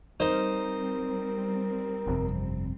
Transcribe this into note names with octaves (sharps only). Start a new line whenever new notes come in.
G3 C4 D#4 A#4 C5
G1 F2 C3